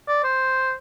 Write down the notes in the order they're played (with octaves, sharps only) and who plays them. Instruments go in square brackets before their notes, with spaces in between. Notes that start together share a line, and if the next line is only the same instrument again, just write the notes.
[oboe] D5
C5